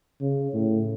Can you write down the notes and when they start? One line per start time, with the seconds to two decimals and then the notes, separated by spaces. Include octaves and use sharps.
0.21 C#3
0.54 A2